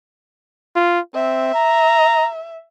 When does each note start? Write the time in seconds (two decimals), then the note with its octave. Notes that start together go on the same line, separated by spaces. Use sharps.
0.76 F4
1.15 C4 E5
1.55 A#5